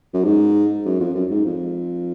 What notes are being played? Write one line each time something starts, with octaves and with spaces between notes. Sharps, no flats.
F#2
G#2
F#2
F2
F#2
G#2
F2